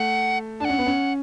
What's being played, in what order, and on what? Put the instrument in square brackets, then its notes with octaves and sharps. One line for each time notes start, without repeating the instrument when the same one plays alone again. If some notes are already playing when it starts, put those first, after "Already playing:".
Already playing: [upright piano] A3 [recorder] F#5
[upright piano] D4 [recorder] A5
[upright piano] C#4 [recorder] F#5
[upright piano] B3
C#4